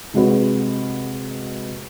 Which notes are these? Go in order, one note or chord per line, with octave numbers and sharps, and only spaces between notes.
C3 G#3 F#4 B4